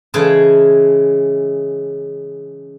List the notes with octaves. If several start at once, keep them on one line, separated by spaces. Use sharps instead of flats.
C#3 E3 G#3 G#4 A5